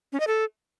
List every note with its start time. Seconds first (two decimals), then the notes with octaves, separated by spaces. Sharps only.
0.13 C#4
0.20 D#5
0.27 A4